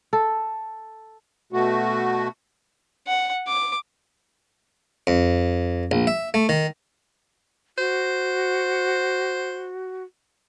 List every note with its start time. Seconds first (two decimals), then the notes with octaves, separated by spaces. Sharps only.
0.13 A4
1.53 B2 A3 F#4
3.07 F#5
3.47 D6
5.07 F2
5.91 A#1
6.07 E5
6.34 A3
6.49 D#3
7.78 F#4 C5